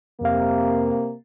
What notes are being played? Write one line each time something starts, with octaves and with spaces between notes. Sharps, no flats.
F2 C3 A#3 F5